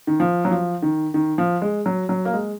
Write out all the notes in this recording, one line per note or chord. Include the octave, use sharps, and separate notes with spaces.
D#3
F3
F#3
F3
D#3
D#3
F3
G#3
F#3
F#3
A#3
G#3